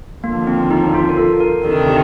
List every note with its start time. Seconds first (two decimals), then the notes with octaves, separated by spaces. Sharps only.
0.23 D#2 D3 F3 A#3
0.47 C4
0.71 D#4
0.94 F4
1.09 A#4
1.17 A4
1.40 A#4
1.64 D2 C3 D#3 G3 D4 A4
1.88 G4